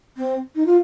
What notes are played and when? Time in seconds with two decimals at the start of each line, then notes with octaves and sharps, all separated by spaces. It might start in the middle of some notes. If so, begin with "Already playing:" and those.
0.17 C4
0.56 D#4
0.66 F4